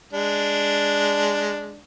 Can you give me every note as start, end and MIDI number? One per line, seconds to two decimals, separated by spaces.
0.13 1.81 56
0.13 1.81 62